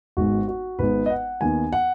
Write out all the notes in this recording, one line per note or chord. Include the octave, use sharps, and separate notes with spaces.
G#1 G#2 G#3 B3 F#4
F#4
G#1 G#2 G#3 B3 B4
D#5
F#5
D#2 D#3 B3 G#5
F#5